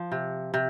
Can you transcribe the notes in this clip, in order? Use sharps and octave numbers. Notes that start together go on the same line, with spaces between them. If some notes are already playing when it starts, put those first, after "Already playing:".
Already playing: F3
C3
C3